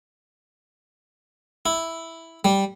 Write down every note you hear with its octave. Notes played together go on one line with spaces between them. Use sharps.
E4
G3